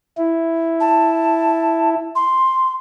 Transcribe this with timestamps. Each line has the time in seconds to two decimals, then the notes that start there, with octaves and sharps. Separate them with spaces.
0.17 E4
0.80 A5
2.15 C6